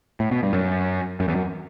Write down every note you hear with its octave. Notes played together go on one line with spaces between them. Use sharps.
A2
B2
G2
F#2
F#2
E2
F#2